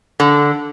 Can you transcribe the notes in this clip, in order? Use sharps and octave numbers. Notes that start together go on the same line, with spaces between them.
D3